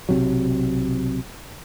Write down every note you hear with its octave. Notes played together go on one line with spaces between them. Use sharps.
B1 C3 F#3